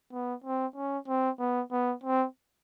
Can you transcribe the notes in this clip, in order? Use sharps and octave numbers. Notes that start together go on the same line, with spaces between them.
B3
C4
C#4
C4
B3
B3
C4